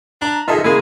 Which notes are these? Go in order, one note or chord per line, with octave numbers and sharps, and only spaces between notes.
D4 A#5
D#3 F4 G#4 A4 D#5 E5
C#3 G#3 A#3 E4 G#4